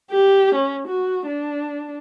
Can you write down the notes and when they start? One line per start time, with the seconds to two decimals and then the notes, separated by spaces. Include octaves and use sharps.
0.11 G4
0.55 C#4
0.87 F#4
1.26 D4